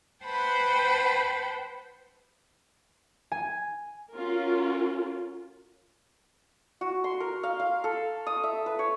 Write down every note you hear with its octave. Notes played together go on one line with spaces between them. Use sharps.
B4 C5 F#5 G5 A5 B5
G#5
C#4 F4 F#4 A#4
F#4
C6
A#4
F5
F5
A4
D#6
E5
B4
C#5